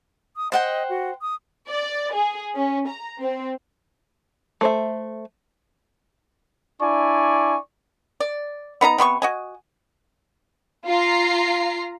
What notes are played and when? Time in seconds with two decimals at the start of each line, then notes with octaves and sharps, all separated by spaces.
0.36 D#6
0.52 C5 D#5 F#5 G5
0.89 F#4
1.21 D#6
1.69 D5
2.14 G#4
2.56 C#4
2.89 A#5
3.21 C4
4.61 A3 C5 E5
6.81 D4 E4 D5 G#5 C#6
8.20 D5
8.81 B3 D#4 E5 A#5
8.98 C3 B3 C6 C#6
9.22 F#4 D#5 G#5
10.87 F4 A#5 C7